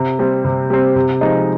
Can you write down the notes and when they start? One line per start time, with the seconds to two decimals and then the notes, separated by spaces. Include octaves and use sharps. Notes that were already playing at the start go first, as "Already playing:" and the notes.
Already playing: C3
0.19 G3 C4
0.45 C3
0.70 G3 C4
0.96 C3
1.21 F3 G#3 D#4